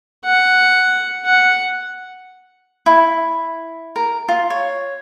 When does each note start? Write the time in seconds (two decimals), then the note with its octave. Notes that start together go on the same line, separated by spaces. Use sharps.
0.25 F#5
1.25 F#5
2.86 E4
3.96 A#4
4.28 F4
4.50 C#5